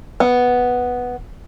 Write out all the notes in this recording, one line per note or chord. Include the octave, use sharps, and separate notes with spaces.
B3